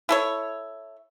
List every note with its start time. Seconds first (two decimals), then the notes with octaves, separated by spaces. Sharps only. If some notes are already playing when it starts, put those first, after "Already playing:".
0.09 E4 A4 C#5